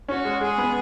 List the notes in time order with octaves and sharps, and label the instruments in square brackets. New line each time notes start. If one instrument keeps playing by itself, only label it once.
[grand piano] C#4 [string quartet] F#4
[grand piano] G#3
[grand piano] G#3 [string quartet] G#4
[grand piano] B3